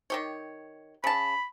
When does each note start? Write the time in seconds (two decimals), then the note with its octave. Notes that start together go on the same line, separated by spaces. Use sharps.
0.10 D#3 G4 C#5
1.04 C#3 A5 B5